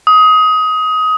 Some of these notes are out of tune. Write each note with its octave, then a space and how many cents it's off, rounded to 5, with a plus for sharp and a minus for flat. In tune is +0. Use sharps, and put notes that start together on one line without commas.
D#6 +20